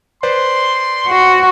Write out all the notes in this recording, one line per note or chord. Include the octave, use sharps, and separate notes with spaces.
B4 C5 D5 C6
F#4